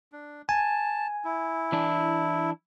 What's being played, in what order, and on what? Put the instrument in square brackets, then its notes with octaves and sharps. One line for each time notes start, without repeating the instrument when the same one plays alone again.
[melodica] D4
[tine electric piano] G#5 [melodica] A5
[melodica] E4
[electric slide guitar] E3 D4